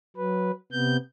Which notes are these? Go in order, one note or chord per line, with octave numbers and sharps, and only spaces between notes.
F#3 B4
C3 B3 G6